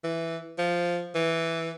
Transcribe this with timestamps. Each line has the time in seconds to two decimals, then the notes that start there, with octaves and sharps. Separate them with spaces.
0.04 E3
0.58 F3
1.15 E3